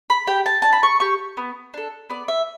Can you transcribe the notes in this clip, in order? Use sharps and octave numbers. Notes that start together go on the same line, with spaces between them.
B5
G4 G5
A5
D4 A5
B5
C#6
G4 C#6
B3
D4 A4
B3 D5
E5